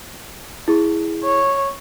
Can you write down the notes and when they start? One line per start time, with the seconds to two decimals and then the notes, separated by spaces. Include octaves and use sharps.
0.68 E4 G#4
1.24 C#5